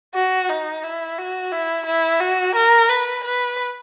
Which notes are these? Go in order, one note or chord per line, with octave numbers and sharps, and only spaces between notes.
F#4
D#4
E4
F#4
E4
E4
F#4
A#4
B4
B4